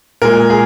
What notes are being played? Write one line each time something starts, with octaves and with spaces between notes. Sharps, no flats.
A#2 G#3 A#4
G#4